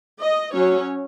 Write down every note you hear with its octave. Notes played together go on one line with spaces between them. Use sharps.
D#5
F#3 C#4 C#5